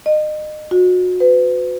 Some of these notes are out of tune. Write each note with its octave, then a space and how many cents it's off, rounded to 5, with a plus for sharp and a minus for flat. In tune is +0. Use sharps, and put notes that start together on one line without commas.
D#5 -30
F#4 -30
B4 +35